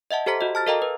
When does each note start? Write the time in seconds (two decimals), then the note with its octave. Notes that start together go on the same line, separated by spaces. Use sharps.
0.11 D#5 E5 F#5 A5
0.26 G4 A4 C5 A#5 B6
0.41 F#4 D#5
0.55 A5 F6 A6
0.67 A4 A#4 D#5 F5 G5 A#5
0.82 B4